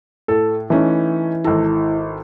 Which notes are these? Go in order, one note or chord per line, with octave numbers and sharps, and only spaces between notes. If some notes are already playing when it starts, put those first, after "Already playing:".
A2 A4
E3 A3 C#4 D#4
G#1 E4 A4